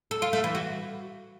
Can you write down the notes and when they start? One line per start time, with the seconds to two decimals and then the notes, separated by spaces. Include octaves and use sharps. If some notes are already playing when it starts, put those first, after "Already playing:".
0.11 A4
0.22 F4
0.33 A3
0.44 E3
0.55 F#4